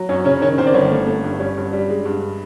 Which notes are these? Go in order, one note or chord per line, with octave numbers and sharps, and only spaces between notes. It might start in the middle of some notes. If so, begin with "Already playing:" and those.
Already playing: F#3
F#2 C#4 C#5
C#3 C#4 C#5
D#3 C#4 C#5
D#3 C4 C5
D5
G1 C#4 C#5
A3
A3
G2
G3 C#4 C#5
G2
G3
G#3
G2